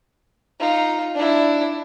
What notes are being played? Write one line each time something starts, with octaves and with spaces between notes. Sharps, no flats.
D#4 F4
D4 E4